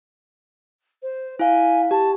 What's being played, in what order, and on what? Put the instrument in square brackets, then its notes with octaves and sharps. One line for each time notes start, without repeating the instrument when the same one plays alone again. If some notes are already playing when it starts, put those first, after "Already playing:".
[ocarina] C5
[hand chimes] E4 F5 [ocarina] G#5
[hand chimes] G4 [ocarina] A5